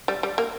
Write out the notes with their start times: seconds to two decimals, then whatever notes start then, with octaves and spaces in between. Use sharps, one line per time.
0.08 G3
0.23 G3
0.38 A#3